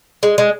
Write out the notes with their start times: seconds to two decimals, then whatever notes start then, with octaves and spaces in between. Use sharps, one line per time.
0.23 G#3
0.38 G#3